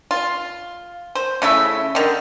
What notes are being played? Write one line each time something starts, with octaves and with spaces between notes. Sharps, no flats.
F4
C5
C#3 A3 E4 E5
D3 D#3